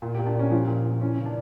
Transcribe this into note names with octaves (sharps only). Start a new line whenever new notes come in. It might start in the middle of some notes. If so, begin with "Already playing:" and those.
A#2
G4
A#2
D4
A#2 C#4
F3
A#2
A#2
E3 C#4
C#3
D4